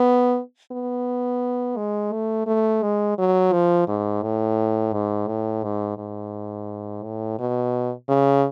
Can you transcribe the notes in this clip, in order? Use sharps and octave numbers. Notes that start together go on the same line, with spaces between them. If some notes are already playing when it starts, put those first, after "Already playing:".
Already playing: B3
B3
G#3
A3
A3
G#3
F#3
F3
G#2
A2
G#2
A2
G#2
G#2
A2
B2
C#3